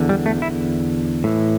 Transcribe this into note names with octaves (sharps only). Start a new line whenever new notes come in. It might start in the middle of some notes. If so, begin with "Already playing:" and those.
Already playing: E2 D3
G3
A3
E4
A2 E3